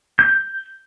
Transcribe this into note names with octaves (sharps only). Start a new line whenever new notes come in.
G6